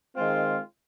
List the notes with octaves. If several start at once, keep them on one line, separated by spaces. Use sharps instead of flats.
D#3 G#3 C4 F4